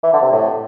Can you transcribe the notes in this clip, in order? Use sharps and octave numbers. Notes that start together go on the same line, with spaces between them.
E3
D3
C3
A2